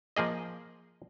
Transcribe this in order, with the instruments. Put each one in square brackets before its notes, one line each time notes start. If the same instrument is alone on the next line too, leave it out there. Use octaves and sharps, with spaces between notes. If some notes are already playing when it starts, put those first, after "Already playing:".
[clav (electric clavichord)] F3 A#3 G#4 D#5